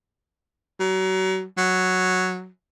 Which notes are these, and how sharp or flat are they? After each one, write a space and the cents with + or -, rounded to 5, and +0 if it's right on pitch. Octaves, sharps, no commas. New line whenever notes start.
F#3 +35
F#3 -5